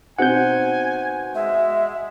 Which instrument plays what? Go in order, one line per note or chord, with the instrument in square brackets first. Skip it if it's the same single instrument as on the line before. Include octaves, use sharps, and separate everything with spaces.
[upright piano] B2 C4 D#4 [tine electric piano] F#5 G6 [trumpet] G#5
[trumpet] G#3 [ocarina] E5